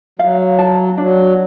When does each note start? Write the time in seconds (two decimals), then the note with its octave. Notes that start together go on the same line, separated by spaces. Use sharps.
0.19 F#3 F5
0.59 A5
0.98 F#3 D4